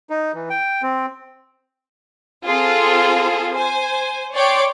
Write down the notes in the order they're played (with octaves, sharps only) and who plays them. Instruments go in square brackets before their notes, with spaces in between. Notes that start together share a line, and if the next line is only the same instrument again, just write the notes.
[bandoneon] D#4
E3
G5
C4
[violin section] C4 F4 G#4 A4
C5 G#5
C#5 D5 G5 C6 D6